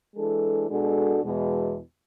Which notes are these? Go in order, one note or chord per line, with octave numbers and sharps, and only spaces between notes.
E3 G#3 D4 A4
B2 G#3 D4 F#4 A4
E2 B2 G#3